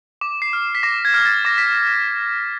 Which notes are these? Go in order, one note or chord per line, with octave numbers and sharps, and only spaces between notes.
D6
C7
F6
B6
D6 A#6
G#6
F6
A6
D6 A#6
B6